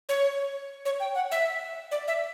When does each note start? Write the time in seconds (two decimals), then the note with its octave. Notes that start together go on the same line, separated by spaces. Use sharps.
0.09 C#5
0.85 C#5
1.00 G5
1.15 F#5
1.31 E5
1.91 D5
2.08 E5